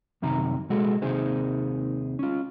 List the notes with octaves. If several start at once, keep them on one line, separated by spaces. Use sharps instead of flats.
F#2 C3 D#3 A#5
B2 G#3 F#4 G#4 A4
D#2 C3 D#4 G#4 C5
C#4 F4